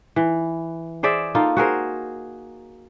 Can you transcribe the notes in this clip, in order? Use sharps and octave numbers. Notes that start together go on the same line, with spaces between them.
E3
G#4 C5 D5 E5
A#3 D#4 F4 A4
F#4 G#4 A#4 C5